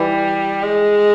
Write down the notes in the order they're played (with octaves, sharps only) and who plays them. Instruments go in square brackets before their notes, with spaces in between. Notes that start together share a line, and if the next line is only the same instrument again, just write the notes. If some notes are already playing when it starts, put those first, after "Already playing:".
Already playing: [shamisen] E3 [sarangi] G3
[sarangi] G#3